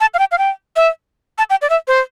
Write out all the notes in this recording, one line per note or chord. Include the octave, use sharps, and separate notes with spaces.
A5
F5
G5
F5
G5
E5
A5
G5
D5
E5
C5